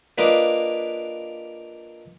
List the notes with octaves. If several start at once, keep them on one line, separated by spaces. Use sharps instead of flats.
A#3 D4 F4 B4 D#5